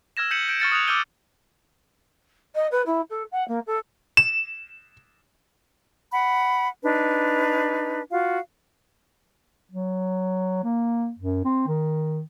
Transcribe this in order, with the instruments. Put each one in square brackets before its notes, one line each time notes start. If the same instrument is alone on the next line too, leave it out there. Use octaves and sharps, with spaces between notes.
[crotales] E6 F6 G#6 A#6 E7
G6 B6 C#7 D#7 F#7
G6 D7
C#6 F6 A6 C#7
D#6 F#6 G#6 F7
D6 E6 F6 G6 D#7 G7
[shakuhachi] D#5
B4
E4
A4
F#5
A#3
A4
[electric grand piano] E7
[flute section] F#5 B5
D4 D#4 B4
F4 F#4 F5
[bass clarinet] F#3
A#3
F#2
C4
D#3